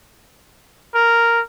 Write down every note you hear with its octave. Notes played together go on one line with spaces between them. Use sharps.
A#4